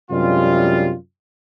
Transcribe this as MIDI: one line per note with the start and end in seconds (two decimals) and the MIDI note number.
0.11 0.93 42
0.11 0.93 48
0.11 0.93 55
0.11 0.93 56
0.11 0.93 62
0.11 0.93 65